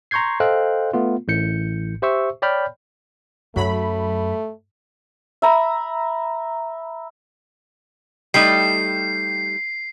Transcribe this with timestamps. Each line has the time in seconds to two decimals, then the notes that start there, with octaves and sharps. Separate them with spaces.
0.11 A#5 C6 C#6 G6 G#6 C7
0.40 A4 C5 D#5 F5 G5 F#6
0.93 A3 B3 F4
1.28 A1 A2 G6 C#7
2.02 G4 C5 E5 C#6 E6
2.42 C#5 D5 G5 B5 F6 G6
3.56 F#2 F#3 A3 B5
5.42 E5 A#5 B5
8.34 G3 A3 D#4 C7